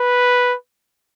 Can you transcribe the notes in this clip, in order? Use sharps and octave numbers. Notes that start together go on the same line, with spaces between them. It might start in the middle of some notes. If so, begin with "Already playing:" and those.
Already playing: B4